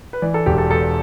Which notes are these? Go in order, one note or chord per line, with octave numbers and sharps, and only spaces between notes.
B4
E3 D5
A4
E1 G4
A4
E2 A4